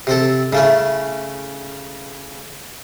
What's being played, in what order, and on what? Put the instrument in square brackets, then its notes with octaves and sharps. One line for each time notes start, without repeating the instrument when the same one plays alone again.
[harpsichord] C3 C4 A4
[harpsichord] C#3 A3 C#4 [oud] E4